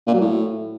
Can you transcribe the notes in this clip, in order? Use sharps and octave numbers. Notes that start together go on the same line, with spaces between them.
A#2
F#3
A2